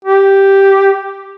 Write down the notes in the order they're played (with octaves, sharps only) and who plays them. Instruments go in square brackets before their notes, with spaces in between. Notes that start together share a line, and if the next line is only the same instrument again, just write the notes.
[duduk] G4